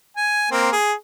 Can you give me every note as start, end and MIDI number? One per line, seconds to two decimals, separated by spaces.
0.17 0.46 80
0.51 0.72 58
0.51 0.72 60
0.72 0.93 68